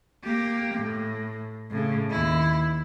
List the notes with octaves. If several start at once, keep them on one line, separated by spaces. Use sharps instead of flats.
A#3 G4
A2
A2 C#3
D#2 E4